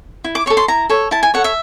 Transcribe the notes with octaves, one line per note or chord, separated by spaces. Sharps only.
E4
D6
A4 C#5 C#6
C6
E4 A#5
A4 C#5
E4 A5
G#5
A4 C#5 F#5
E5